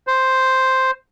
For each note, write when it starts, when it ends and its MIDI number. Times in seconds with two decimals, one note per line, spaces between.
0.07 0.91 72